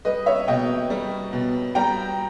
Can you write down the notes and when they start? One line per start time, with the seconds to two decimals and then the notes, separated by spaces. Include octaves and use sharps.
0.05 G3 B4 D#5
0.26 C#5 E5
0.48 B2 D#5 G5
0.90 G3
1.33 B2
1.75 G3 G5 A#5